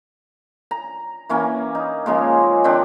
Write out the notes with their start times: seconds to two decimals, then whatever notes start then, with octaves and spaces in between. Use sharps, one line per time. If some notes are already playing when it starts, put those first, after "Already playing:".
0.71 A#5
1.29 E3 A#3 C#4
1.75 D#4
2.06 C#3 F3 G#3 A#3
2.64 D#3 C4 D4